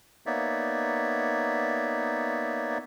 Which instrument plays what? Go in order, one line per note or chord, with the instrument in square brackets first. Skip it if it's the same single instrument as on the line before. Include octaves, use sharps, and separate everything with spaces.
[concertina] A#3 B3 D#4 C#5 D5 E5